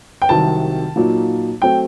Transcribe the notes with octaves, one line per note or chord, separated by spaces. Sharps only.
G5
C2 C3 D#3 F#3 A5
A#2 F#3 A#3 D#4
F#3 A3 C4 G5